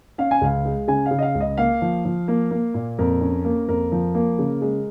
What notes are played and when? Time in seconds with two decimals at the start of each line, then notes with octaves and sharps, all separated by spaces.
0.18 C#4 F5
0.31 G#5
0.41 C#2 F5
0.65 G#3
0.88 C#3 G#5
1.06 F5
1.11 C#3
1.19 D#5
1.22 F5
1.35 C#2
1.41 D#5
1.58 A#3 F5
1.82 F3
2.05 F3
2.28 A#3
2.51 A#3
2.74 A#2
2.99 F2 A#4
3.21 C#4
3.45 A#3
3.68 F2 A#4
3.92 F3
4.15 A#3
4.39 C#3
4.62 G#3